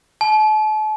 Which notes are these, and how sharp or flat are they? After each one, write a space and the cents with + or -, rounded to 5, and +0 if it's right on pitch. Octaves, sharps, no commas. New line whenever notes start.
A5 -40